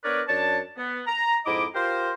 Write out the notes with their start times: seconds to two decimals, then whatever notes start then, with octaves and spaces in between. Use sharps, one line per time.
0.04 B3 D4 A#4 B4 C#5 D5
0.28 F#2 D4 C#5 A5
0.77 B3
1.07 A#5
1.46 F2 G#2 E4 D#5 D6
1.75 F4 G4 A#4 C5